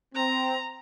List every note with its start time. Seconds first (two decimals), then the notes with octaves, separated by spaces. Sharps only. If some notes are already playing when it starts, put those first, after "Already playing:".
0.15 C4 A#5